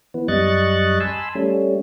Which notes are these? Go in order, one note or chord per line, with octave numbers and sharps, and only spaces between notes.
E3 B3
F#2 G3 D#5 C#6 F#6 A6
G#5 A5 B5 C6 E6
G3 A3 C#4